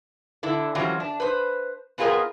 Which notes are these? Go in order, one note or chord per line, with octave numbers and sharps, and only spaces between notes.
D3 D4 E4
E3 F#3 G3 C4 C#4 F4
D4
B4 C5
B3 C4 F4 G#4 A#4 D#5